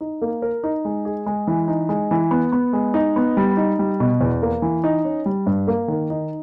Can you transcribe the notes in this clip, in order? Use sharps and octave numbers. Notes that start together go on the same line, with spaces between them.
D#4
A#3
A#4
D#4
G#3
G#4
G#3
E3
D#4
G#3
E3
B3
B3
G#3
D#4
B3
G3
D#4
G3
B2
E2
A#3
E3
D#4
C#4
G3
G2
A#3
D#3
D#4